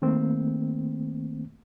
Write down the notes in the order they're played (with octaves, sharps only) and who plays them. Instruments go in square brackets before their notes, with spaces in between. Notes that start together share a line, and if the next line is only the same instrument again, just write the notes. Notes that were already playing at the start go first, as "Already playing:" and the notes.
[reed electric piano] D#3 A3 A#3 C4